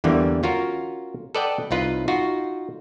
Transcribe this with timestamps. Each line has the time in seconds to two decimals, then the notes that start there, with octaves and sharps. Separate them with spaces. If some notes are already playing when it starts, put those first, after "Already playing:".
0.04 E2 D3 E3 G3 A#3
0.43 C#4 F4 F#4 A#4
1.35 A4 B4 D5 D#5 F#5 G5
1.71 C2 D#4 F4 B4
2.08 D#4 F4 F#4